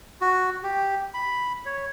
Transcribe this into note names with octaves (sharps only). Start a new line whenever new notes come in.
F#4
G4
B5
C#5